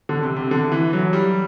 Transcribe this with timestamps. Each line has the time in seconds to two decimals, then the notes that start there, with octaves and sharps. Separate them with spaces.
0.09 D3
0.23 C3
0.37 C3
0.51 D3
0.72 E3
0.93 F#3
1.13 G3